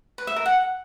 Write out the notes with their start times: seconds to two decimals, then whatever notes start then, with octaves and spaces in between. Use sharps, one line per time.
0.18 B4
0.27 E5
0.36 A#4
0.46 F#5